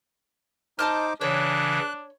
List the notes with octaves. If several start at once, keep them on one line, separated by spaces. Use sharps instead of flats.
D#4 C5 D#5 A5 D6 F6
C#3 E3 D4 C#5 F#6